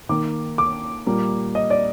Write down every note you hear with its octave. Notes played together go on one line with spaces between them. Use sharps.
D#3 A#3 D6
D6
A#2 G3 A#3
D#5
D5